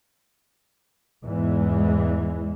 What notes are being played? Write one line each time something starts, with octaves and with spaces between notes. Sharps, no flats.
E2 G#2 E3 G#3